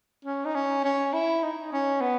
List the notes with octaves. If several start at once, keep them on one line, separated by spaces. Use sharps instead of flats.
C#4
D#4
C#4
C#4
E4
D#4
C#4
B3